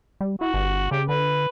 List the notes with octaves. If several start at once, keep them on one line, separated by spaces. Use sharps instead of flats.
G3
E4 F#4
G1
C#3 G4
D3 B4